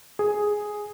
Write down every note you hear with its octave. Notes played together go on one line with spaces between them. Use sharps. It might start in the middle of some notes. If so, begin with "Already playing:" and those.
G#4